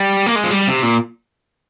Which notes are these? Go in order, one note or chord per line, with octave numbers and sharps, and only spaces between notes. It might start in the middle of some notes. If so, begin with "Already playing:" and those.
Already playing: G3
A#3
G#3
F3
G3
C3
A#2